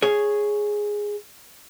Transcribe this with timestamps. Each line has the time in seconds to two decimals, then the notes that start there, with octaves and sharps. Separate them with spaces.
0.02 G#4 C#5